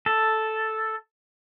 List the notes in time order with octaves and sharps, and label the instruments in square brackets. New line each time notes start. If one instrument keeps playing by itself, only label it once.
[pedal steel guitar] A4